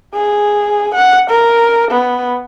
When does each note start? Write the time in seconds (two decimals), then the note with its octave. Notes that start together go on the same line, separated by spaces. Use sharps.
0.15 G#4
0.94 F#5
1.30 A#4
1.91 B3